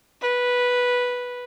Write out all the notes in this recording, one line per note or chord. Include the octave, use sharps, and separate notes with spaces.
B4